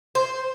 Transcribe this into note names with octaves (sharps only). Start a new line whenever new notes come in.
C5